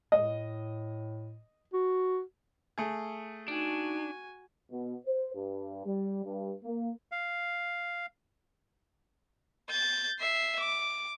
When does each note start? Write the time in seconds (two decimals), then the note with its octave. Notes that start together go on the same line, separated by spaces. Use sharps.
0.12 A2 D#5
1.74 F#4
2.78 A3 G#4
3.48 D4 D#4 F#4 G#5
4.71 B2
5.06 C5
5.35 G2
5.85 G3
6.24 G2
6.63 A#3
7.12 F5
9.70 G6 A6
10.20 E5 C7
10.59 D6